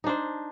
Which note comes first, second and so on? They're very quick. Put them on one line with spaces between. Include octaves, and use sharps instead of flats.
D#4 D4 C5